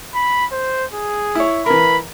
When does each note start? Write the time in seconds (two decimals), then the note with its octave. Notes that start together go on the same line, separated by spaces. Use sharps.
0.15 B5
0.52 C5
0.93 G#4
1.35 E4 C#5
1.66 E3 A#4 B5